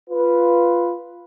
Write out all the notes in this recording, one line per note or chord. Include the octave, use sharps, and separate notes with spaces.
F4 B4